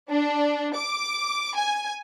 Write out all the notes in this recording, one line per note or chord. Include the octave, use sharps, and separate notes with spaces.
D4
D6
G#5